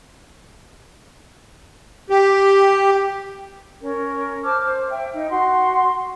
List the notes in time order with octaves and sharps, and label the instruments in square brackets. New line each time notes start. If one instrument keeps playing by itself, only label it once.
[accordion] G4
[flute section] C#4 A#4
C5 A5 D6 F6
C5
E5 G5
D#4
F#4 F#5 C6